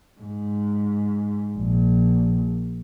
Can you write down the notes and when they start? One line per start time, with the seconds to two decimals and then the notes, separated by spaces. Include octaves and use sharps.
0.21 G#2
1.56 A#1